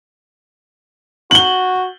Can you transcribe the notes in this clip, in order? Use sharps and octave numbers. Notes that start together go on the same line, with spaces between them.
F#4 F#7 G7